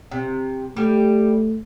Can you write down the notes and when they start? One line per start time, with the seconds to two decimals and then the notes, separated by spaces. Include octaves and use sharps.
0.11 C3
0.76 G3 A3 G4